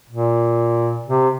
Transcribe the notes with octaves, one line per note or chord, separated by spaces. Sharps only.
A#2
C3